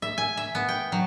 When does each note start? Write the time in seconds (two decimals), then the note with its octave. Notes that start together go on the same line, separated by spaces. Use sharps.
0.02 E5
0.18 G#5
0.37 E5
0.55 B3
0.69 G5
0.92 F#3